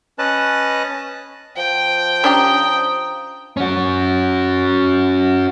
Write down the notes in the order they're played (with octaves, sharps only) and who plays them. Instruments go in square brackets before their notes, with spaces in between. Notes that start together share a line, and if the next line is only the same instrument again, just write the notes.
[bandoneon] C#4 B4 D#5 A5 F#6
[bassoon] F3 [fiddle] G5
[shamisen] C#4 D4 G4 [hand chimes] A#5 D#6
[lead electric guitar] C#4 F#4